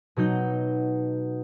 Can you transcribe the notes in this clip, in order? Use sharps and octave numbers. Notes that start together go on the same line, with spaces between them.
B2 F#3 D#4 G6